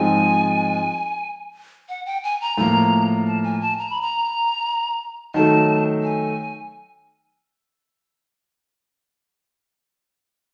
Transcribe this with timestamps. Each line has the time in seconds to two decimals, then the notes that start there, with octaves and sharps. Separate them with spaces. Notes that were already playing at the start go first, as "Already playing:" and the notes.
Already playing: G#2 F3 G#3 C4 D#4 G#5
1.89 F#5
2.06 G5
2.24 G#5
2.41 A#5
2.57 A2 F3 A#3 A#5
3.27 A5
3.44 G#5
3.61 A5
3.79 A#5
3.90 B5
4.02 A#5
5.34 D#3 F#3 A3 A5
6.03 G#5